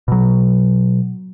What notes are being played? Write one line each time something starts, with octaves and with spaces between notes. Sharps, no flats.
B2 F#3